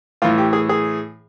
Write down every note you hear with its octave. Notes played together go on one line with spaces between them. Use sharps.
A2 E3 F4
G4
G#4
G#4